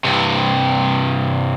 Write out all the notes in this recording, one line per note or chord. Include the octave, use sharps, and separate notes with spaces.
G2 C3